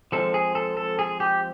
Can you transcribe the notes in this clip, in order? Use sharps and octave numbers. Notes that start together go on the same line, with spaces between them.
F3 G#3 C4 A4
G#4
A4
A4
G#4
G4